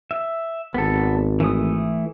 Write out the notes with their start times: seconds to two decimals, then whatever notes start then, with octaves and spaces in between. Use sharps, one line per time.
0.11 E5
0.74 G#1 B3 A4
1.40 E3 A3 D#6